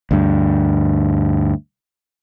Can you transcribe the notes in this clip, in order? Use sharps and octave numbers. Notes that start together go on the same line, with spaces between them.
D2 G2